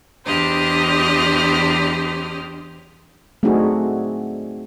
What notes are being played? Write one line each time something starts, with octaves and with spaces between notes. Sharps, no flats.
E2 D4 G4 C5 D#5 F6
A3 C4 D4 D#4 F#4 G#4